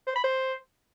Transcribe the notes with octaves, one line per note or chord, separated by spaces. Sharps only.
C5
B5
C5